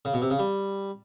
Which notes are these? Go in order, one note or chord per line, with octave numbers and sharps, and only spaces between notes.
C#3
B2
C3
C#3
G3